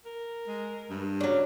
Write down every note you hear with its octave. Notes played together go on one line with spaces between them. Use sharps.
A#4
G#3
G2
C#3 F#3 D4